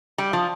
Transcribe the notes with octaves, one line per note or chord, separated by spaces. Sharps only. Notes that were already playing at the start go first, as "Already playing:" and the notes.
G3
F3